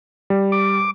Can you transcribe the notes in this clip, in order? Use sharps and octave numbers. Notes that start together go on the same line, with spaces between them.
G3
D6